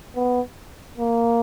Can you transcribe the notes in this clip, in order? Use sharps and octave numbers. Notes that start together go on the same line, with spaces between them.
B3
A#3